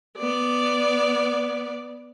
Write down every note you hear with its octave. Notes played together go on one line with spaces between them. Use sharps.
B3 D5